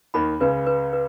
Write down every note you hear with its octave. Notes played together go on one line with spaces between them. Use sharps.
D#2 D#3 B5
C#2 C#3 B4
B4
B4